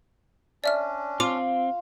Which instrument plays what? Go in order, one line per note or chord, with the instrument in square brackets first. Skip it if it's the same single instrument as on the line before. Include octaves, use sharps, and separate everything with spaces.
[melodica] C#4 D4 [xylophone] D5 E5 F6
[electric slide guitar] C4 [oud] F4 [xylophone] D6